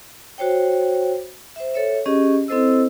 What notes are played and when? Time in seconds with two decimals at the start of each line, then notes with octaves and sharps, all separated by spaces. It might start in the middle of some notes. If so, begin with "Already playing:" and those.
0.38 F#4 C5 C#5 G5
1.56 C5 E5
1.74 A4 C#5 E5
2.06 C#4 G4 G#4 D#5
2.48 C4 E4 A4 C5 D#5 E6